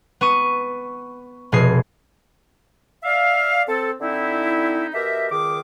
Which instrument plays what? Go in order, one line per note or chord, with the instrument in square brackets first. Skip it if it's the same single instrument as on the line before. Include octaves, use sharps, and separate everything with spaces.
[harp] B3 C#6 D#7
F1 B2 G#4 C7
[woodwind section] D5 E5 F5
C4 A4
D3 C4 D#4 E4
B2 G4 A#4 E5
C#2 D#3 G#4 D6